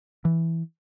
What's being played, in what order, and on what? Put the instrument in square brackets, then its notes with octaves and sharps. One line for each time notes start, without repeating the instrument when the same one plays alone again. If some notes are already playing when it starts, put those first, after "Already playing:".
[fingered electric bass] E3